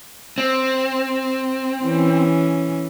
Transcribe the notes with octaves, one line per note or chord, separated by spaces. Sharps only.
C4
E3 C#4